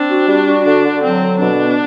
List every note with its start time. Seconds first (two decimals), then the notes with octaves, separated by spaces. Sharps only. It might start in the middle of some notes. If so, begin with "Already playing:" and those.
Already playing: C4 D4
0.09 F#4
0.27 G3
0.46 F#4
0.65 D3 D4
0.84 D3
1.03 F#3 C4
1.22 D3
1.40 B2 D4
1.60 B3